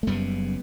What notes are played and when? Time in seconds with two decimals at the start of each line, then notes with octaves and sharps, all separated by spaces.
0.03 A3
0.07 F#1 F#2 C#3 G3 B3